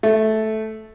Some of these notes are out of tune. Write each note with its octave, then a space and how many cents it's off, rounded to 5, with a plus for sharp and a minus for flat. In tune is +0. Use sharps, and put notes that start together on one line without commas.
A3 -10